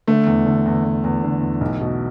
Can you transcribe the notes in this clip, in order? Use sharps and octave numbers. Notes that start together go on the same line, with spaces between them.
D3 A3
E2
D3
E2
E2
E2
D3
E2
B1
B2